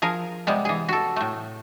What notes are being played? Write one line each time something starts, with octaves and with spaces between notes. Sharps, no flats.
F3 G#4 A#4
C3 G3 G#3 B3
E3 G#4
F#4 A4
A2 A3